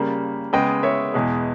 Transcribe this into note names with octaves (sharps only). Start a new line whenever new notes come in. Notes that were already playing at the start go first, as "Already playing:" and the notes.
Already playing: C#3 G3 A#3
C#3 G#3 B3 D#5 G5
C#5 E5
E2 B2 G#3